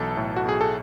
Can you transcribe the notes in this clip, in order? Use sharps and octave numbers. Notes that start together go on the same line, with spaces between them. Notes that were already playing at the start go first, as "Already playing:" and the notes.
Already playing: B1 E3 A4
A2
F#4
B1 G#4
A4